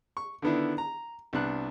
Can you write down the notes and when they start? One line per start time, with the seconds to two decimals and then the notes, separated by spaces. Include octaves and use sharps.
0.17 C#6
0.42 D3 D#3 B3 D4 E4
0.78 A#5
1.33 C2 B3 D4 F#6